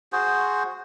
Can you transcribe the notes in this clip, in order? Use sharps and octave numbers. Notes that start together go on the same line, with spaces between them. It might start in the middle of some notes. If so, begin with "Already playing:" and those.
F#4 G#4 C5